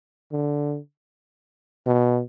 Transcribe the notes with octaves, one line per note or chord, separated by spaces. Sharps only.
D3
B2